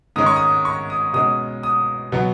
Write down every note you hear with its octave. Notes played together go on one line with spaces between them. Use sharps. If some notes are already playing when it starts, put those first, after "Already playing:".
G#2 D#3 G#3 C#4 D#6
C#6
D#6
C#6
D#6
B2 G#3 C#4 D#6
D#6
B2 F#3 B3